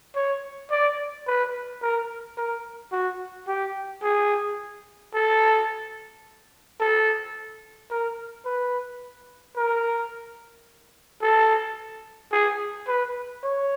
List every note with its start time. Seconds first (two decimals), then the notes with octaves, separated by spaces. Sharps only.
0.15 C#5
0.71 D5
1.27 B4
1.82 A#4
2.37 A#4
2.92 F#4
3.47 G4
4.02 G#4
5.14 A4
6.80 A4
7.90 A#4
8.45 B4
9.56 A#4
11.22 A4
12.32 G#4
12.88 B4
13.43 C#5